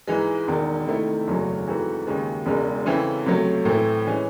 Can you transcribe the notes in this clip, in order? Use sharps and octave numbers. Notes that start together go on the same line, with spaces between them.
G#2 E3 G#3
E1 E2 D#3
C3 D#3 A3 C4 E4
F#1 E2 C#3 F#3 A3
G#2 E3 C4 F#4 A4
D#2 C#3 G#3
E1 E2 C#3 G#3
C#3 E3 C4 E4 A4
C#2 C3 F#3 A3
A2 E3 A3 C4 E4
E3 G#3 C#4